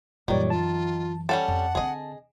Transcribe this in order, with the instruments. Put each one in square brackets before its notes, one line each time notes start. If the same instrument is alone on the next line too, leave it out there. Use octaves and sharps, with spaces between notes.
[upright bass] F#2 E3 [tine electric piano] A#2 G3 C#5 [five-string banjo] D#3 [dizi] D5
[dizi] F4 [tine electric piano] A5
[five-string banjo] G3 C#4 A4 [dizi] F#5 [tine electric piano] A5
[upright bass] F2
[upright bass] D3 C4 [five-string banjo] G#4 D#5